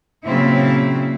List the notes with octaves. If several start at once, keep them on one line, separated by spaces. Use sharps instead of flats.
A#2 C#3 F#3 A#3 C4 E4